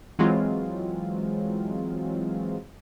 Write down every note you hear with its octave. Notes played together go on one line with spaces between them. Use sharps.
E3 F#3 G#3 C4 F4